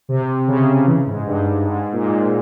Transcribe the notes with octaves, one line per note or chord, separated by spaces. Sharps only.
C3
C#3
E3
G#2
G2
G2
G#2
A#2
G#2